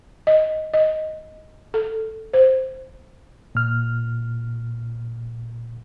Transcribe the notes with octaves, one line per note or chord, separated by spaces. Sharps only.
D#5
D#5
A4
C5
A#2 F6